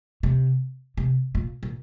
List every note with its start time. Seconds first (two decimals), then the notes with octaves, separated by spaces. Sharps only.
0.23 C3
0.97 C3
1.35 A#2
1.63 A#2